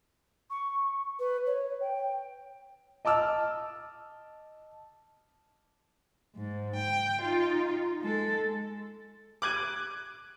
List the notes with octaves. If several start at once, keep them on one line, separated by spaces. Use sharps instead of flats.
C#6
B4
C#5
G5
D#5 A5 D6 E6 F6
G#2
G5
D#4 F4
G#3 A4
D6 F#6 G#6 D#7